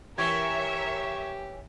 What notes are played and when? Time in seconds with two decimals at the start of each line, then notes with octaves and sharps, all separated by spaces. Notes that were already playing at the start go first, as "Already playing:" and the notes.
0.18 E3 C#4 G4 A#4 C#5 E5 C#6 G#6